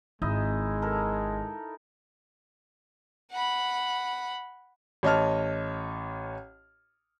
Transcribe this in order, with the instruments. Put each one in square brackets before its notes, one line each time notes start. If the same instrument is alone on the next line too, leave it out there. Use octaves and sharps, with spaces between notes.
[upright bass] G#1 [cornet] G#3 [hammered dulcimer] D#4 E4 D#5
[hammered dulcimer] A4 A#4
[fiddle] F#5 B5
[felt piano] A1 C#5 D#5 A5 F6